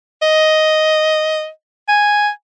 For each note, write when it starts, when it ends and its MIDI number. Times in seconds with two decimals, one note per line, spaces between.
0.22 1.49 75
1.89 2.29 80